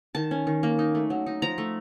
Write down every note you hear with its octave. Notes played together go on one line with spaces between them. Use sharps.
D#3 A5
C#4
D#3
A#3
D#4
A3
F#3
D#4
F3 A#5
A3